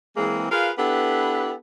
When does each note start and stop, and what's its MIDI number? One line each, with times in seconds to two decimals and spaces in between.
0.17 0.46 52
0.17 0.46 56
0.17 0.46 58
0.17 0.46 60
0.17 0.46 68
0.51 0.72 65
0.51 0.72 68
0.51 0.72 70
0.51 0.72 71
0.51 0.72 77
0.79 1.53 59
0.79 1.53 62
0.79 1.53 64
0.79 1.53 67
0.79 1.53 69
0.79 1.53 71